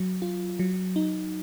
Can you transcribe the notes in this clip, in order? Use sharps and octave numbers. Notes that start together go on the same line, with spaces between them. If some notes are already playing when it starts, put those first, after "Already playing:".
Already playing: F#3
F4
F#3
D#4